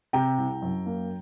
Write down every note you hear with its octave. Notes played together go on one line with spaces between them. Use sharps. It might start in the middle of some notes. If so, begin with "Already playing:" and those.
C3 G5 A#5
C2
F#2
A#3